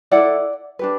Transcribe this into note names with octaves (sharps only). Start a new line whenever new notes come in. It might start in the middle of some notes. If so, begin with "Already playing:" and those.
E4 A4 D5 F#5
D4 G4 B4